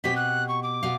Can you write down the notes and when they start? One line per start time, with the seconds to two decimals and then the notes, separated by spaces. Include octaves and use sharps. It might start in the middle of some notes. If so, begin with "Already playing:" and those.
0.04 B2 C4 G4 B6
0.16 F#6
0.48 C#6
0.63 D6
0.83 B2 F5